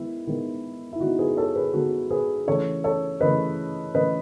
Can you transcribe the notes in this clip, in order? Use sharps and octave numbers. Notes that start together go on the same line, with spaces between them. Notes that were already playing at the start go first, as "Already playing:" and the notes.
Already playing: D#3 G#3 B3 E4
D#3 G#3 B3
E4
D#3 G#3 B3 D#4 F#4
G#4 B4
A4 C#5
G#4 B4
D#3 G#3 B3 F#4 A4
G#4 B4
C#3 E3 A3 A4 C#5
A4 C#5
C#3 E3 A3 B4 D#5
C#3 E3 A3 B4 D#5